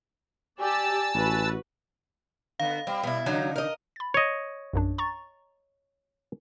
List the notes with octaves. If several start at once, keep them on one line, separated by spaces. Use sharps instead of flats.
G4 D5 G#5 A5 E6
A1 F#4 B4
D3 B3 F5
G3 C4
B2 G3 E4
C#3 F#3 D4 D#4
A#4 D#5
B5 A6
C#5 D#5
A#1 F#2 D4
A#5 C#6 A6